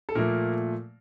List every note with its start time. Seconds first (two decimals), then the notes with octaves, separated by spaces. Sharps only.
0.09 A4
0.15 A#2 F3 A3 A#3 A#4